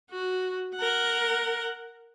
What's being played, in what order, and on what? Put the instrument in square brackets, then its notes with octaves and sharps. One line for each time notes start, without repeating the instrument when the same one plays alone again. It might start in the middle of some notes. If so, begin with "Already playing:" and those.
[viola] F#4
A#4 F#5